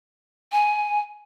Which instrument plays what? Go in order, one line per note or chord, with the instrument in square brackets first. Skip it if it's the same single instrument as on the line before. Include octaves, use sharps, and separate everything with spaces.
[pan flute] G#5